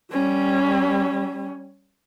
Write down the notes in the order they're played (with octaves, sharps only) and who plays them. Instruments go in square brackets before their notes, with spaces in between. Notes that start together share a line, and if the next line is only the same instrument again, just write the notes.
[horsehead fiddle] G3 C#4